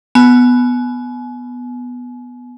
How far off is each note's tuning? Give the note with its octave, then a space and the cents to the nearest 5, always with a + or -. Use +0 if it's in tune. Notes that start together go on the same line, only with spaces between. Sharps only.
B3 +0 G#5 +40